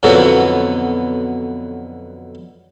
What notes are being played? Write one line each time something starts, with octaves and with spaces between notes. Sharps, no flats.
F2 B2 D3 F#3 B3 E4